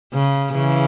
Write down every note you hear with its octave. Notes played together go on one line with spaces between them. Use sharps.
C#3
C#3 E3